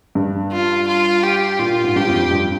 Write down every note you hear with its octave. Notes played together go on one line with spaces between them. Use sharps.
G2
F4
F4
G4
A#2 F4
G#2
G2 G4
F2
G2